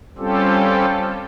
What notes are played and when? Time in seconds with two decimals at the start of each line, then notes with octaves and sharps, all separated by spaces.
0.18 G3 C4 C#4 F4 G4 A4